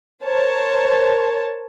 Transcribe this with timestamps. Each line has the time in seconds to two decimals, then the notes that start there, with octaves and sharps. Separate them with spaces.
0.24 A#4 C5 C#5 A5